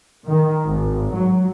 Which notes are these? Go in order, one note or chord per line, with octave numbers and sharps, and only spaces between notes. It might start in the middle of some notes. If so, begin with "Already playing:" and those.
D#3
G#1
F#3